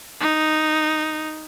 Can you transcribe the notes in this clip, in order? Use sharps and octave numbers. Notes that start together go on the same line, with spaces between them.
D#4